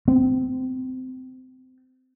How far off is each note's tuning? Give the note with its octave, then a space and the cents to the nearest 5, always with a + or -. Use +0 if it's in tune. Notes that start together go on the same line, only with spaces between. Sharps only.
C4 -25